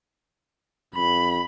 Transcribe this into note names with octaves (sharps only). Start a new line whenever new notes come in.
F2 B5